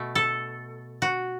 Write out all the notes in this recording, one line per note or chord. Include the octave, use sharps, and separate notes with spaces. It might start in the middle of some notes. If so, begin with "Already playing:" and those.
Already playing: B2 A3
A4
F#4